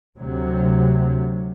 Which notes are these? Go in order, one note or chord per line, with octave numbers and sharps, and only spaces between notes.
D2 C3 F#3